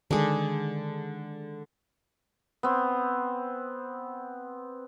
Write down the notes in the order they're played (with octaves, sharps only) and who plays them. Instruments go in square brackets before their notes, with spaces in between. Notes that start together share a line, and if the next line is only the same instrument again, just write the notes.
[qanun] D3 G#4 [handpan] D#3 G#3
[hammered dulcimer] B3 C4